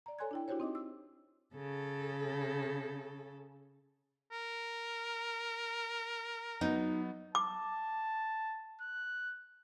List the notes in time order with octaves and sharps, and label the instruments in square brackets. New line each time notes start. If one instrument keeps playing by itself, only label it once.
[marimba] D5 A#5
A4 C#5 G#5 C6 F#6 G#6
D4 E4 G5
D4 E4 F#4 G4 C5 C#5
C4 D#4 D#5 D6
E6
[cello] C#3 A4
[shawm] A#4
[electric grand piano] F#3 B3 [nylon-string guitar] D#4
[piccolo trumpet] A5 [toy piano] D6
[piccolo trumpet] F#6